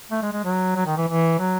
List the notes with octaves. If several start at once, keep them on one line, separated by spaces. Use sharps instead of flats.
A3
G#3
G#3
F#3
F#3
D#3
E3
E3
F#3